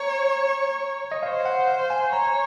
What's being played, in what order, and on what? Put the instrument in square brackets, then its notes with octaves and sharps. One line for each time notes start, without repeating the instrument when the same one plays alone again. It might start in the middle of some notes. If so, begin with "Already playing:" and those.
Already playing: [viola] C#5 [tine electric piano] A#5
[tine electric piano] D#5
[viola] C5 [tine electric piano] F5
[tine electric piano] F#5
F5
G#5
[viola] C#5 [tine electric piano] A#5